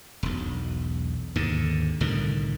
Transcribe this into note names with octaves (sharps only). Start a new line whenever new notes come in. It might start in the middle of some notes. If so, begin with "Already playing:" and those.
E1 B1
D#2 G#2 D3
C2 A2 D3 D#3